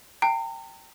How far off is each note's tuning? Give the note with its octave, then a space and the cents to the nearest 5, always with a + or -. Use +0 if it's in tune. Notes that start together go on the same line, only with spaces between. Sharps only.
G5 +0 A#5 -40